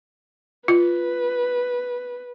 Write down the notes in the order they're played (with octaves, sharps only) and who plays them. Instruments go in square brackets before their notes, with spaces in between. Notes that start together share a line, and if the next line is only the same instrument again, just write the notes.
[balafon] F4 [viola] B4